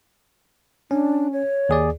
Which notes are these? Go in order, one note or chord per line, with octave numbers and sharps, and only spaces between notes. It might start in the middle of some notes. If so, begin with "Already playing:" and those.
C#4 D4
C#5
D#2 G#4 D5